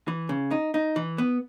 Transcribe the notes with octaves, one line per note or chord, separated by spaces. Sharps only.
E3
C#3
D#4
D#4
E3
B3